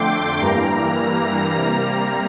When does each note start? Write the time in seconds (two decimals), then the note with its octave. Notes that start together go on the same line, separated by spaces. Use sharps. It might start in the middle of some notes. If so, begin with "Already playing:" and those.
Already playing: F2 D3 A3 G5 C6 D6
0.39 G2 E3 G3 A#3 A#5
1.53 C3 G3 A#3